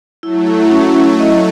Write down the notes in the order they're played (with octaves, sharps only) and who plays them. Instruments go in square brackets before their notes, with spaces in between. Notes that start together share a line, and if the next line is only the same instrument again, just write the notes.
[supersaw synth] F#3 A3 [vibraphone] E4
[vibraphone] E4
C#4
E4
D#5